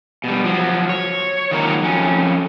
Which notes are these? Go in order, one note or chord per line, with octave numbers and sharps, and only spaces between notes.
B2 G3
F3 F#3
C#5
D#3 F#3 G#3 A#3 F4 A#5
F2 C#4